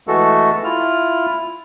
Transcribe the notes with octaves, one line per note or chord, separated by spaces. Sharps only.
E3 G#3 A3 F#4 A4
E4 F4 F6